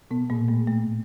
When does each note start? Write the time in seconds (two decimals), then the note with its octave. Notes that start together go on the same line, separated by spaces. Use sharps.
0.11 B2 B3
0.30 A#2 A#3
0.48 A2 A3
0.67 A2 A3